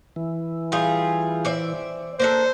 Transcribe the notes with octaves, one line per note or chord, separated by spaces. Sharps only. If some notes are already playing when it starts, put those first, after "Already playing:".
E3
G3 F4 G#4
C4 D5 E5
A#3 D4 A4 C5